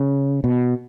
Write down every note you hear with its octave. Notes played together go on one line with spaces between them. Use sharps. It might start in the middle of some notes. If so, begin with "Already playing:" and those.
Already playing: C#3
B2